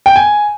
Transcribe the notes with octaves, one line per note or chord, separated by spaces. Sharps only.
G5
G#5